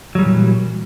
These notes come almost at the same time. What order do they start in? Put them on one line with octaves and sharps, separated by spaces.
F#3 G3 E3 A#2